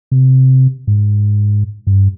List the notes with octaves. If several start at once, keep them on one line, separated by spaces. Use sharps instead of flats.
C3
G#2
G2